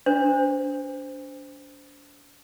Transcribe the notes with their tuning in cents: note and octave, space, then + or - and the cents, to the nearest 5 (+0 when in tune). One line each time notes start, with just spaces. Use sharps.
D4 -35 C5 -15